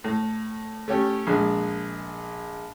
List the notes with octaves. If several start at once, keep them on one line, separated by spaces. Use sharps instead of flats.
A2
A3 C#4 G4
A#1 G#3